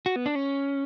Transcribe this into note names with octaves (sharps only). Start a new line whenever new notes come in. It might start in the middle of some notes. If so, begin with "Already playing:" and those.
F#4
B3
D4
C#4